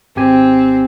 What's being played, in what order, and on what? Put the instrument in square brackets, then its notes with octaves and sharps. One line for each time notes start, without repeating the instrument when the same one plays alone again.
[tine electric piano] G#1 G4 G#5 [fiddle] C4